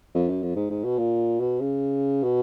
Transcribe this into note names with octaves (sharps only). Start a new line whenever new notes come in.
F2
F#2
F2
G#2
G#2
B2
A#2
B2
C#3
B2